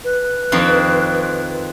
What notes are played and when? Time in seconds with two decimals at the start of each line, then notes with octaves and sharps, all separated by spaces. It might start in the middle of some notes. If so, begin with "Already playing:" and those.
0.04 B4
0.52 F2 D#3 C4